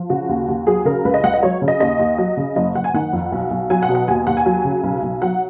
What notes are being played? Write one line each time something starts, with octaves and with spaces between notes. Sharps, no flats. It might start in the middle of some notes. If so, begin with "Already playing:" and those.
Already playing: F3
C#3 F#4
D#2
D#2
F#3 G#4
C#3 A#4
C#2 B4
D#5
C#2 F#5
D#5
F#3 C#5
C#3
D#5
D#2 D#5
D#2
F#3
C#3
F#1 D#5
F#1 F#5
G#5
D#3 F#5
F2
B1
B1
F#3 G#5
F#5
B2
F#5
D#2 G#5
D#2 F#5
G#5
F#3
C#3
B1
B1
F#3 F#5